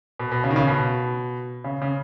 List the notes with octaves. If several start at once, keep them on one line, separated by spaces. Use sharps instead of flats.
B2
B2
C#3
D#3
C#3
B2
C#3
C#3